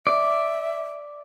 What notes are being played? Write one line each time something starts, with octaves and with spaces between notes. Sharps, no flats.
D5 E5